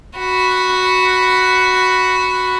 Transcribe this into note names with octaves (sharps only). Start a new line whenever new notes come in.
F#4 B5